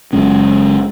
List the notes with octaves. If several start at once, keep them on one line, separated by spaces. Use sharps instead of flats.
F#1 F#2 G#3 C#4